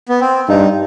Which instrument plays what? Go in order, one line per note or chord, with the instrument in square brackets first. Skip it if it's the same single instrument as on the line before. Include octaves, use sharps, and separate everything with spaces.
[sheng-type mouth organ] B3
C4
[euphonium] G2 [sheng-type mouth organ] D#4